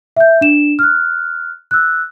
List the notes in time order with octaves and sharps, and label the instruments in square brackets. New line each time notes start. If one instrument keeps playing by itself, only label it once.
[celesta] E5 G6
D4 E7
F6 F#6
E6 F#6